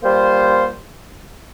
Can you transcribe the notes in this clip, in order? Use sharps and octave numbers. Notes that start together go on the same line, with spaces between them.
G3 A#3 F4 C5